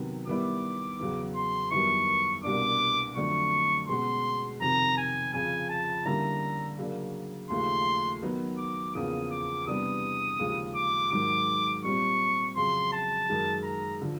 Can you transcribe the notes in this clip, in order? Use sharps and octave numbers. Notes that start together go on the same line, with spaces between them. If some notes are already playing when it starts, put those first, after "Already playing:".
Already playing: C3 D#3 F#3 B3
D#3 G3 B3 E4 D6
E2 C#3 F#3
C6
F#2 D#3 G3 B3 E4 C#6
C2 B2 G3 A#3 D4 D6
F2 D3 F#3 A3 D4 C#6
B2 G#3 C#4 F#4 C6
F2 C3 D#3 A#5
G#5
F2 C#3 F3 G#5
A5
D3 G3 A#3 C#4 E4 A#5
C#3 F#3 A#3 D4
D#2 C#3 F3 A3 C6
D#3 F#3 B3 D#4
D6
E2 C#3 F3 A#3 C#4 D#6
D6
C3 E3 G3 B3 D4 D#6
D#2 C#3 F3 G#3
D6
G#2 D#3 F#3 D6
A#2 G3 C4 C#6
F2 C#3 F#3 C6
A5
F#2 D#3 G#3
A#5
D3 F3